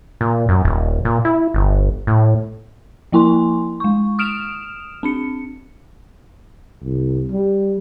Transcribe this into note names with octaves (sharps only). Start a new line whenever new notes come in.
A#2
F#2
D#1
A#2
E4
G1
A2
F3 A#3 E4 G#5 C6
G#3 C#6
D#6 F6 D7 E7 F7
C4 D4 C#7
C2
G3